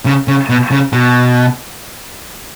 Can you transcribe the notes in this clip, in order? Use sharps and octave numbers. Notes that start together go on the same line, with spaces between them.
C#3
C#3
B2
C#3
B2